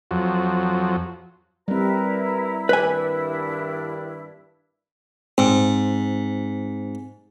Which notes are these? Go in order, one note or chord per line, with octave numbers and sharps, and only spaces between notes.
F2 F#3
G3 C4 E4 A#4 B4 A#5
G2 D#3 D4 B4 G#5
G#2 C4